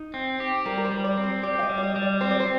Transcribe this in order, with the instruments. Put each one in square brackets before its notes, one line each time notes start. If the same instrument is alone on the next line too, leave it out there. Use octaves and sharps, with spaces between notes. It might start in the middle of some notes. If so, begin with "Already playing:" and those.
Already playing: [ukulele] D#4
[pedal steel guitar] C4
G4
[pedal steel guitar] G3 [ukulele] A#4
[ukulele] A#4
C5
[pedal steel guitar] G3
[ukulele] D5
[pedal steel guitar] C4
[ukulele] C5
[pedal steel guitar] G4 [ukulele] D5
[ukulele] F5
D#5
[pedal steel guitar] G3
[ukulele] D5
D#5
[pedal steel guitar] G3
[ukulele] D5
[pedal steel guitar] C4 [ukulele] C5
[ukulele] D5
C5